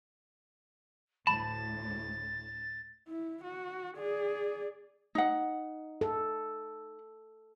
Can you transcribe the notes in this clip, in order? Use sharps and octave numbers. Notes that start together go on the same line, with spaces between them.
D2 A2 A5 B5 A6
E4
F#4
G#4 D5
D#4 F#5
A4